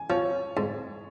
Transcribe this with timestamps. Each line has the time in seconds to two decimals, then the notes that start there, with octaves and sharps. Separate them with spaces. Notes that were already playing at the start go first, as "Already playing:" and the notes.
Already playing: G#5
0.10 F3 C#5
0.57 G#2